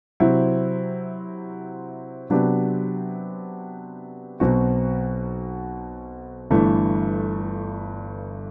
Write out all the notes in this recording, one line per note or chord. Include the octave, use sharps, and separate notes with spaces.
C3 F#3 C4 E4
C3 F#3 B3 D4 G4
B1 B2 F#3 C4 F#4
G1 G2 E3 A3